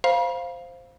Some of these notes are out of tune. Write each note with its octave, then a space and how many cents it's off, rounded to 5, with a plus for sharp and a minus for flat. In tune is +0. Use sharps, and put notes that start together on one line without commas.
C5 +0 F5 +0 B5 -45